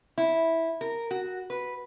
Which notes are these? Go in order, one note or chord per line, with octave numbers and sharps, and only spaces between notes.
E4
A#4
F#4
B4